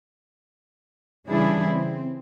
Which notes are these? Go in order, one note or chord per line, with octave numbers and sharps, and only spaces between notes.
C#3 E3 G3 D4 E4 G#4
C4